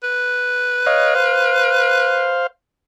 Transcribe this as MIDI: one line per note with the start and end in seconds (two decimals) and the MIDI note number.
0.03 2.33 71
0.86 1.14 73
0.86 1.14 75
0.86 1.14 77
1.15 2.47 72
1.15 2.47 77